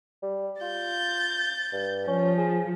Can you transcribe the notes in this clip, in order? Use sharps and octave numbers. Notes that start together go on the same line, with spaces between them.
G3
F4 G6 A6
G2
F3 C#4
G#4